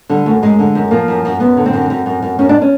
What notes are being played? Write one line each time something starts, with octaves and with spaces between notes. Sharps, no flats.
D3 G3
F#2 A3
F#2 G#3
D3
F#2
F3 A#3
F#2
F#2
F#2 B3
D3
C4
F#2
F#2
F#2
F#2
F#2 C#4
D4
C#4